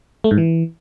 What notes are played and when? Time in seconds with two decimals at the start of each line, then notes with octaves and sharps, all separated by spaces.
0.24 A3
0.31 G#2
0.38 E3